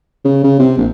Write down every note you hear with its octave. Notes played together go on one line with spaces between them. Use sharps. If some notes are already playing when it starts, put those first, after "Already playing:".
C#3
C#3
C3
A#1